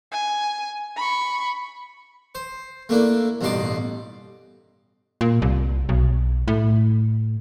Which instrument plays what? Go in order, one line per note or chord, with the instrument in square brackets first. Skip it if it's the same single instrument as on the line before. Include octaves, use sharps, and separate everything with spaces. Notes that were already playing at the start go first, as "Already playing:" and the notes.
[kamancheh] G#5
B5 C#6
[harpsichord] C5
A3 A#3 D4 E4
A1 G2 B2 D#4 C6 D6
[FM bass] A#2
C2
B1
A2